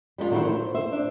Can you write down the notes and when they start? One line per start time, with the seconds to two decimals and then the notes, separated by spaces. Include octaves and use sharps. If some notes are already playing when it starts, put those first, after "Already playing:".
0.18 G3 G#3 D4 F4
0.31 D3 D#3 F#3 A3 C4 E4
0.45 C5
0.75 C5 E5
0.92 D4